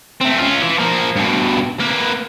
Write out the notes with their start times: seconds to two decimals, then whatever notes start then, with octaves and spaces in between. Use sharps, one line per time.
0.21 A3 C4
0.39 C#4 F4
0.62 E3
0.79 F3 A#3
1.16 G2 B2
1.80 A#3 B4